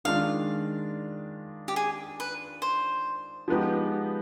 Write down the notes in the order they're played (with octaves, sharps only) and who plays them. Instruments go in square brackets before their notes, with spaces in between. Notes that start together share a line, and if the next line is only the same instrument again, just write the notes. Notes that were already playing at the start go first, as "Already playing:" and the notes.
[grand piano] D#3 G#3 D4 F4 [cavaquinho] F5
[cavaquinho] G4
G#4
B4
C5
[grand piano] F3 G#3 B3 D#4 G4